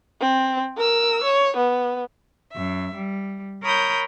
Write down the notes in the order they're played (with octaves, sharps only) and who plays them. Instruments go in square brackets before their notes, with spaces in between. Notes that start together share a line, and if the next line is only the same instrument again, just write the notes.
[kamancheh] C4
A#4 E6
C#5
B3
[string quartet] F#2 E5
G3
A#4 C#5 B5 D#6 G6